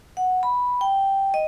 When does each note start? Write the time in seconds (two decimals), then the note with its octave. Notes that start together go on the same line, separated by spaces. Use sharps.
0.17 F#5
0.43 B5
0.81 G5
1.34 D#5